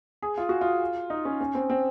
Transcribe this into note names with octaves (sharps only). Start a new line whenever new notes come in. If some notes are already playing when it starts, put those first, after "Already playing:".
G#4
F4
F#4
F4
D#4
C#4
C#4
C4
C4